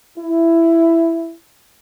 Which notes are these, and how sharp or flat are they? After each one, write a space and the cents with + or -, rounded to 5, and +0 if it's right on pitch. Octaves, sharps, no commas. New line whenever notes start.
E4 +10